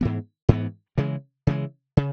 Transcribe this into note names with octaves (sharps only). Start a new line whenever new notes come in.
G#2 E3 B3
G#2 E3 B3
C#3 E3 G#3
C#3 E3 G#3
C#3